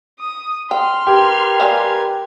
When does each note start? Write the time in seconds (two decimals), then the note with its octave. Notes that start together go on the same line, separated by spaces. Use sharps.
0.19 D#6
0.71 G5 C6 F6
1.07 G4 A#4 B4 G#6
1.60 G3 F5 G#5